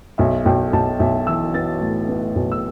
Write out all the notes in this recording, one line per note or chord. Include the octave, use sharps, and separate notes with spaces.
B1 E5
B1 G5
B1 A5
B1 E5
E3 E6
B3 A6
A2
B3
B1
E6